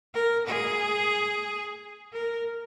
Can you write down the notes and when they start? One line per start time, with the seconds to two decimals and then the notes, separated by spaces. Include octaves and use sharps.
0.14 A#4
0.47 G#4
2.13 A#4